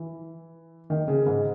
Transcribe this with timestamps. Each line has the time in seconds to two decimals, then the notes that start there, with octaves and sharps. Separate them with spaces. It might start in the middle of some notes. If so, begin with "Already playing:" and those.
Already playing: E3
0.90 D#3
1.08 C#3
1.27 G#2